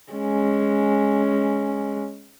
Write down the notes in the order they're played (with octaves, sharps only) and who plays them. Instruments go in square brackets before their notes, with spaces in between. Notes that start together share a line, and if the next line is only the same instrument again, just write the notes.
[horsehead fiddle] G#3 C#4